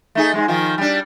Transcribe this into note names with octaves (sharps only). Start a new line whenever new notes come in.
A3 D#4 G#4
G#2 B2 G#3
D#3 F3 F4
G3 D4